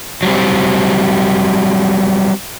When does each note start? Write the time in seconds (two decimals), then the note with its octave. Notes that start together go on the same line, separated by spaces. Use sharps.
0.23 F#3 G3 C4